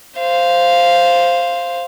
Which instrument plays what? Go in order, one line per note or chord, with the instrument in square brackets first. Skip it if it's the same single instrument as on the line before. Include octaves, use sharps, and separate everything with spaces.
[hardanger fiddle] C5 F5